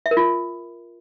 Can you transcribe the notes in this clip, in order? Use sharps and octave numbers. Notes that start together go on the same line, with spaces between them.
E5
A#4
F4